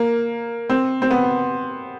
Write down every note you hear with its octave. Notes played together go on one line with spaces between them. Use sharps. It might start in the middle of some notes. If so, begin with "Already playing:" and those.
Already playing: A#3
C4
C4
B3